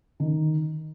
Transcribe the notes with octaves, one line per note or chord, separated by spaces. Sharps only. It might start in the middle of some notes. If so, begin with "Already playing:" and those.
D#3